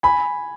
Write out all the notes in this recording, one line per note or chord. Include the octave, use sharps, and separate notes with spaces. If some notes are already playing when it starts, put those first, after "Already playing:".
G#5 B5